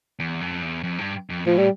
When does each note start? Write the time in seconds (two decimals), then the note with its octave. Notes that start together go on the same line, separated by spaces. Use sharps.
0.19 E2
0.41 F2
0.62 E2
0.83 F2
0.99 G2
1.30 F2
1.46 A2 F3
1.58 G3